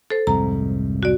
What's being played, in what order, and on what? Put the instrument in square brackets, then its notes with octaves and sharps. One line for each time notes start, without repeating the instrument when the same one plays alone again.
[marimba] A4 C5
[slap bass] C2 F2 G#2 [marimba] A#5
[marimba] F#4 D5